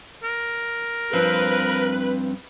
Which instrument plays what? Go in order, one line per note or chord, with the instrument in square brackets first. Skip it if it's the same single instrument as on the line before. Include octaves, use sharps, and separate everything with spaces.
[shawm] A#4
[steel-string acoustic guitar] G2 F3 C4 [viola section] B4